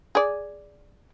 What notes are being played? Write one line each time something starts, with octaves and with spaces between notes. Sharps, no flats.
G#4 D5